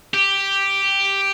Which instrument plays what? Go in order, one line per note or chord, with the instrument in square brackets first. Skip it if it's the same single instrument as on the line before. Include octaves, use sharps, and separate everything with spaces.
[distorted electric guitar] G4